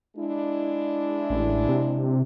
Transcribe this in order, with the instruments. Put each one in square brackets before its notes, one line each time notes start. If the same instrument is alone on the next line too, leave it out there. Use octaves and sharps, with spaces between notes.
[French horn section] G#3 D4 E4
[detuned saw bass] A1
C3